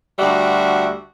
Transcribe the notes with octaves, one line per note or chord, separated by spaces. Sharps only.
D2 G3 F#4 E5 F#5